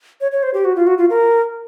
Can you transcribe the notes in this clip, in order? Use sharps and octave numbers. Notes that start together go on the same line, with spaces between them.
C#5
C#5
C5
G4
F#4
F4
F#4
F4
A#4